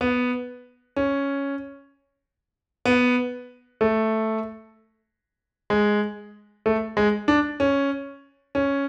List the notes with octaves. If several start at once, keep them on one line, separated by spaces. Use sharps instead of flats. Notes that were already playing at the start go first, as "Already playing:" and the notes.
B3
C#4
B3
A3
G#3
A3
G#3
D4
C#4
C#4